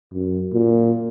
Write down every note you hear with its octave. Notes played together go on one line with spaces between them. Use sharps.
F#2
A#2